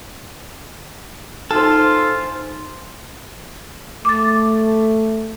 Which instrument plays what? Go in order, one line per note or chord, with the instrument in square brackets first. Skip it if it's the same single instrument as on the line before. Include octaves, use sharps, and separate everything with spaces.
[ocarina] D#4 [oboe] F4 [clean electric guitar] A4 [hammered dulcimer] C5 F5 G#5
[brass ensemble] A3 [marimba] D6 A6